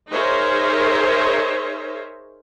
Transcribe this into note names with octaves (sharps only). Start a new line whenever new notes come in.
D#4 G#4 A#4 C5 C#5 E5